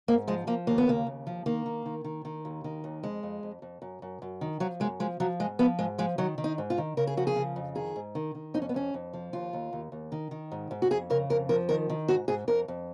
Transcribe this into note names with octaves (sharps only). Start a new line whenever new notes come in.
G#2 A#3
F3 G#3
F3 A#3
D#2 A#3
B3
C#3 A#3
D#2
F3
D#3 A#3
D#3
D#3
D#3
D#3
D#2
D#3
D#2
F2 G#3
F2
F2
F2
F#2
F#2
F#2
D#3
F3 F#3
F#2 G#3
F3 G#3
F3 F#3
G#2 G#3
F3 B3
G#2 G#3
F3 G#3
D#3 F#3
D#3
D#4
G#2
F4
D#3
C#3 A#4
G#4
F3 F#4
G#4
C#3
F2
D#3 G#4
G#2
D#3
D#3
F2 D#4
C#4
B3
F2 C#4
F2
F3
D#2 F4
D#2
D#2
D#2
D#3
D#3
G#2
G#2
F#4
F2 G#4
C#3 A#4
F2 A#4
F3 A#4
D#3 A#4
D#3
G#2 F#4
G#2 G#4
F2 A#4
F2